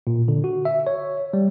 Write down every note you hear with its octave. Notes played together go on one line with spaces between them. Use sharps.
A#2
D3
F#4
E5
C#5
G3